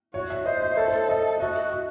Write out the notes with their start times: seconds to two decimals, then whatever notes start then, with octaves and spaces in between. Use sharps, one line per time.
0.14 F#4 C#5
0.30 E5
0.46 C5 D#5
0.62 D#5
0.77 A4 C#5
0.88 C5
1.09 D#5
1.40 F#4 D#5
1.72 E5